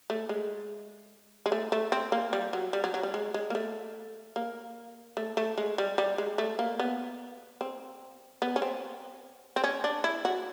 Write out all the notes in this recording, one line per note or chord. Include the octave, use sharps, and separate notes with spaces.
A3
G#3
G#3
A3
A3
C4
A#3
G3
F#3
G3
F#3
F#3
G3
G#3
G#3
A#3
A3
A#3
A3
A3
G#3
G3
G3
G#3
A3
A#3
B3
C4
B3
C#4
C4
C4
C#4
D4
E4
F#4